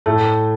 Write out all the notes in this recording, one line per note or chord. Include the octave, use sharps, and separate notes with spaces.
A2 A3